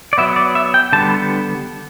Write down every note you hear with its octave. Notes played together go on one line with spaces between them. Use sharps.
D5
F#3 B3 E5
D5
E5
G5
D3 G3 B3 A5